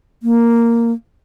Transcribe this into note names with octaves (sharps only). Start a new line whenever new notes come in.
A#3